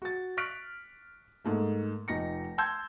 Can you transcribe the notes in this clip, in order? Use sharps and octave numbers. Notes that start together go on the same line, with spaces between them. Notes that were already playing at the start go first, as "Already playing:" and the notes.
F#4 A6
C#6 F6 F#6 B6 D7
G#2 A3 A#3
F1 D#4 A#6 C#7
A5 C6 E6 G6 G#6